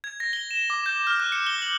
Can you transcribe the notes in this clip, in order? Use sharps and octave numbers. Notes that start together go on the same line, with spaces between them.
G#6
A#6
G7
E7
D6
G6
F6
F#6
C#7
G7
F#7